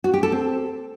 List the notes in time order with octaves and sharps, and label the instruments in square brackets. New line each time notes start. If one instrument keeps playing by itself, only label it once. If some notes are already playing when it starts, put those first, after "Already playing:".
[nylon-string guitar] F#4
G4
A4
C4